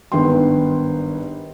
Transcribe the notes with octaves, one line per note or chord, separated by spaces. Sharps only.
G#1 G2 B3 G5 C6